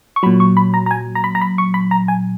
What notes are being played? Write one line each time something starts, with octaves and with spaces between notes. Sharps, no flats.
C#6
A#2 F#3 B5
C#6
B5
A#5
A#5
G#5
A#5
B5
A#5
B5
C#6
B5
A#5
G#5